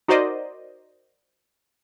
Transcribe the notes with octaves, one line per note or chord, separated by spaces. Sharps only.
D#4 F#4 A#4 C5 D5 D#5